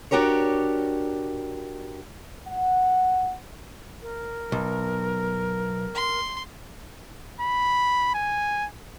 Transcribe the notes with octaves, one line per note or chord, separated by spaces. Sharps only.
D4 F#4 G4 A#4 C#5
F#5
A#4
B1
C6
B5
G#5